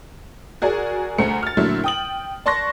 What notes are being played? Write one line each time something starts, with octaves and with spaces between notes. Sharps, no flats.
F#4 G#4 A#4 D5 G#5
D2 A3 C5 A#5 C#7
F6 A6
A#2 D3 F#3 A3 E4
G5 D#6 F#7
D5 A5 C6 C#6 F#6 A#6